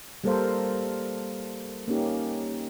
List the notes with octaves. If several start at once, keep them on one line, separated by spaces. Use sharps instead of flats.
G3 A#3 A4 A#4 C5 F5
A#3 C#4 D#4 G4